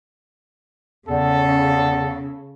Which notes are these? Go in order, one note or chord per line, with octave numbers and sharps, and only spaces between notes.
E2 C#3 A4